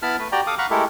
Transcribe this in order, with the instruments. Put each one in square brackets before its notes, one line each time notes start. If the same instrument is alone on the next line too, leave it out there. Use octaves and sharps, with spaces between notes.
[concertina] B3 E4 A5 B5 F6
A3 B4
F#4 G4 D5 G5 A#5
A4 F5 D6 D#6
F5 F#5 A#5 B5 C#6
G#3 A3 E4 G4 A4 A#4